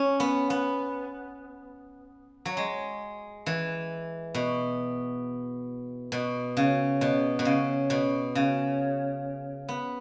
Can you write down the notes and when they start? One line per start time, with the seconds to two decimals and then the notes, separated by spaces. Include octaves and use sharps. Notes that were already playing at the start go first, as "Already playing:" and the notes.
Already playing: C#4
0.20 B3
0.50 B3
2.45 F#3
2.57 G#3
3.46 E3
4.35 B2
6.12 B2
6.57 C#3
7.01 B2
7.39 B2
7.45 C#3
7.90 B2
8.35 C#3
9.69 B3